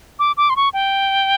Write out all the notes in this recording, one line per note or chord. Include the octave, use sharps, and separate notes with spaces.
D6
D6
C6
C#6
G5